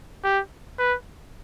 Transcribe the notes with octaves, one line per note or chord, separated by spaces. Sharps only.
G4
B4